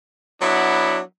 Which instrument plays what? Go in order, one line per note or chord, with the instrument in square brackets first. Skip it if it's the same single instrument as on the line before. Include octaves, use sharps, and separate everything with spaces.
[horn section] F#3 B3 D4 E4